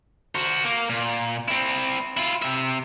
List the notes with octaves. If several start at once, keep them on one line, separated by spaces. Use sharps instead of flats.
F#4 C5
A#3
A#2
C4 E4
E4 F4
C3 E5